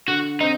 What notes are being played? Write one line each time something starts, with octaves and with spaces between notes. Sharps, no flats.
D3 F#4
C4 D#4